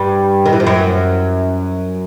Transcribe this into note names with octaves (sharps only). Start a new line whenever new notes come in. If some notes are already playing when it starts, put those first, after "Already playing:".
Already playing: G2 G3
D#3
E3
F3
F#2 F#3